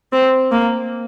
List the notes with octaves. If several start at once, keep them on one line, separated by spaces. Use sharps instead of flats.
C4
A#3